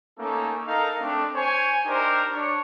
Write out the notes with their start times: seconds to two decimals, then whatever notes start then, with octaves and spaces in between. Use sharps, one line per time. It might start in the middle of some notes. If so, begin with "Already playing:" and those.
0.19 A3 A#3 C#4 D#4 A4
0.67 D#4 A4 A#4 F5 A#5
1.01 A3 C4 D4
1.35 C5 C#5 G#5
1.86 D4 D#4 G4 A#4 C5
2.31 D4 C#5